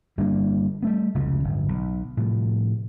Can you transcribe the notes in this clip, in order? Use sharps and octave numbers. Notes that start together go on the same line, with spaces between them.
G1 G3 A#3 D4
G3 A3 B3
F1 C#2 C#3
D1 G1
B1
A2 C3 F3